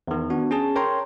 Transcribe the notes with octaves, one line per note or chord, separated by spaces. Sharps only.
E2 D#3
B3 D4 F#4
C#4 G#4 A5
A#4 C#5 G5 A#5 C6